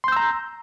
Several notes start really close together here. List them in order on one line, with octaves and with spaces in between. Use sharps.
C6 G6 E6 A#5